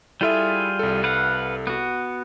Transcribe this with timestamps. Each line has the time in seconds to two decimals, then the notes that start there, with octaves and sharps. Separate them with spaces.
0.21 G3 E4 F4 G#4 A4 E5
0.79 C2 A4
1.04 B4 F5 F#5
1.67 B3 F#4